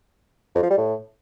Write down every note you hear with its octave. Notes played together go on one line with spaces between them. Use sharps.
F2
F3
G3
A2